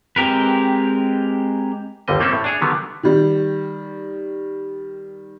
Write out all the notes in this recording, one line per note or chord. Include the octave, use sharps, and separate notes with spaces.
G#3 C4 G4 A#4 B4
G1 D#2 D3 G3 D#5
A3 A#3 C4 C#4 A4
A2
D4 G#4 C#5
D3 D#3 F#3 G3 B3
D#3 G3